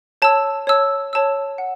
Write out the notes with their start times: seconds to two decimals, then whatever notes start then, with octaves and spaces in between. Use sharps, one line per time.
0.22 C#5 A5 E6
0.67 C#5 A5 E6
1.13 C#5 A5 E6
1.58 F#5